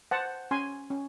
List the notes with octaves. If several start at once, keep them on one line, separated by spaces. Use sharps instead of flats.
C5 F#5 A5
C#4 G#5 C6
C#4